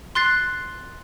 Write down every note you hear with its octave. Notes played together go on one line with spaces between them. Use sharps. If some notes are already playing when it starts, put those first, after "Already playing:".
C6 F#6 A6 C7